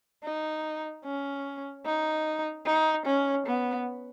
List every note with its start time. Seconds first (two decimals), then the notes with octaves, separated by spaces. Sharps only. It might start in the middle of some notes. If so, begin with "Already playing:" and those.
0.24 D#4
1.05 C#4
1.85 D#4
2.66 D#4
3.06 C#4
3.46 B3